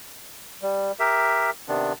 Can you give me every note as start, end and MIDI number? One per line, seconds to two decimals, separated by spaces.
0.62 0.92 55
1.00 1.50 67
1.00 1.50 70
1.00 1.50 76
1.68 1.93 48
1.68 1.93 51
1.68 1.93 59
1.68 1.93 62